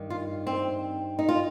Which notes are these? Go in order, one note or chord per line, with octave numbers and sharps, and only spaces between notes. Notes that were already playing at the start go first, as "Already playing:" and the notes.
Already playing: G2 D#3
F4
C4
D#4
F4